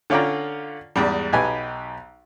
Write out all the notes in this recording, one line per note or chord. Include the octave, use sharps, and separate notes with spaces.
D3 C#4 F4 D5 G5 A#5
E2 G#2 G3
B1 D#4 G4 B4 G#5